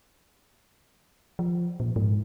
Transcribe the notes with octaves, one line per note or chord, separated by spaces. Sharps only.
F3
A#2
G#2